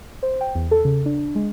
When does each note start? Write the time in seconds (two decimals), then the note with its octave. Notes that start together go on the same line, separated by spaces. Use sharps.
0.23 C5
0.41 G5
0.55 E2
0.71 A4
0.85 C#3
1.06 D4
1.35 G#3